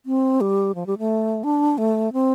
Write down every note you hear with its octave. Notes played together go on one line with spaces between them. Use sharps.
C4
G3
F3
G3
A3
D4
A3
C4